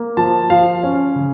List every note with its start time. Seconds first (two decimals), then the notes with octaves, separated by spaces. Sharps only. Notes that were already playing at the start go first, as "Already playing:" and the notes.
Already playing: A#3
0.17 F3 A5
0.50 F3 F5
0.83 C#4
1.16 C#3